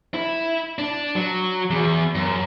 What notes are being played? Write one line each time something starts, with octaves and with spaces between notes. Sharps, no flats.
E4
D4
F#3
E2
F#2